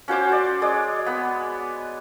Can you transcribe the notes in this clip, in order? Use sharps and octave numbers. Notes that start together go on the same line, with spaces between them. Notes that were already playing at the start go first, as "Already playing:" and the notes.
C#4 F#4 C5 D6
D5
G#3 C#5 D5
B3